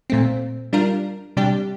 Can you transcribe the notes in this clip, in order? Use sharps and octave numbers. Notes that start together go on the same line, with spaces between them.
A#2 A3 C4
G3 D4 F4 A#4
C3 G3 D4 G4